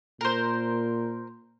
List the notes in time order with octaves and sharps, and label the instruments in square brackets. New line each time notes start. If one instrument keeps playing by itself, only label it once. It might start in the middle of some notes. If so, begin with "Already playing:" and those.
[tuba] A#2 [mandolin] A#4 C5